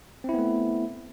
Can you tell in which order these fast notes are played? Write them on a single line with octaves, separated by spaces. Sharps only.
C4 E4 B3 A3